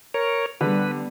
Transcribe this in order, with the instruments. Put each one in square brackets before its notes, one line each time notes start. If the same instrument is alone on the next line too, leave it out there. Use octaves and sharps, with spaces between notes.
[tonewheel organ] A#4 C#5
[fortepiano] D3 [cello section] G3 B3 [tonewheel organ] B4